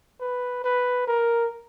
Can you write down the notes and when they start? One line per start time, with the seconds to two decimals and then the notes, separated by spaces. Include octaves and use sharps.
0.21 B4
0.64 B4
1.07 A#4